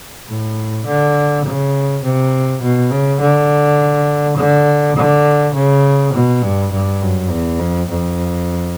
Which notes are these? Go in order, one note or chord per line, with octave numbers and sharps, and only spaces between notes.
A2
D3
C#3
C3
B2
C#3
D3
D3
D3
C#3
B2
G2
G2
F#2
E2
F2
F2